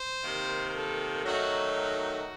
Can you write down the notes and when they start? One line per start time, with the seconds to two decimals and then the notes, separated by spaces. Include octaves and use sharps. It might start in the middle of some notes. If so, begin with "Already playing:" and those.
Already playing: C5
0.24 C3 D#3 A#3
0.74 A4
1.25 D#3 F#3 A3 D#4 F#4
1.75 F#4